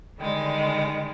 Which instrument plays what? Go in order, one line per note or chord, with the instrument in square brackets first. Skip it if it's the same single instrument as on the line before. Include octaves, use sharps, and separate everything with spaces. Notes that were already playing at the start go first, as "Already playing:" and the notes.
[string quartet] D3 D#3 G3 G#3